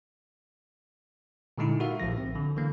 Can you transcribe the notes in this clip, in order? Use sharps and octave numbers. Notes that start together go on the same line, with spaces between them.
A#2 D3 G#3 D#4 E4
F#4 G4 A#4 E5 F5
A#1 A2 F3 A#6
C4
D3
D3 E3 A#3